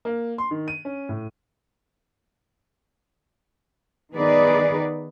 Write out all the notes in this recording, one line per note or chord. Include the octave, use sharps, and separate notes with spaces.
A#3
C6
D#3
D#7
C#4
A2
D#3 B3 D#4 G#4 B4 D5